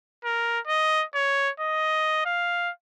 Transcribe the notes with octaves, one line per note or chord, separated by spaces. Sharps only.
A#4
D#5
C#5
D#5
F5